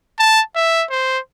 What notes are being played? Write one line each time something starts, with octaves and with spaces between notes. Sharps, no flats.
A5
E5
C5